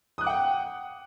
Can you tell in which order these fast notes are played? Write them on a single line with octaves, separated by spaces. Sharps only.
D#6 F#6 D6 F#5 G5